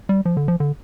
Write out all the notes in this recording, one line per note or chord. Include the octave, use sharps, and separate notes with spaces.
G3
F3
D3
F3
D3